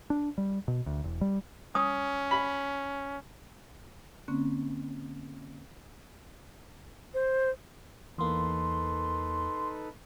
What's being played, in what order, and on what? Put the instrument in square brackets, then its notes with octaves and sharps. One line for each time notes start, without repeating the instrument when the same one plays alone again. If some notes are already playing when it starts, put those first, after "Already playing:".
[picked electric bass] D4
G3
B2
D2
E1
G3
[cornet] C#4 [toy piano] D#6
[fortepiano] B5
[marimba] D3 A#3 C4 C#4
[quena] C5
[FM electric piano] E2 A#3 [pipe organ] D#4 A4 B4 [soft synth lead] C6